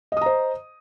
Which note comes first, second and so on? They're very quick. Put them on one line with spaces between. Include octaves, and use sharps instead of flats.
D#5 D#6 A#5 C5